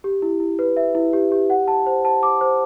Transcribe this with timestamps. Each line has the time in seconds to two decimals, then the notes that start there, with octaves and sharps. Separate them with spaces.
0.04 G4
0.22 E4
0.40 E4
0.59 B4
0.77 E5
0.95 E4
1.13 G4
1.32 G4
1.50 F#5
1.68 A5
1.86 C5
2.05 A5
2.23 D6
2.41 C5